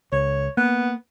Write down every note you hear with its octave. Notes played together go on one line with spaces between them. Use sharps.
C#2 C#5
A#3 B3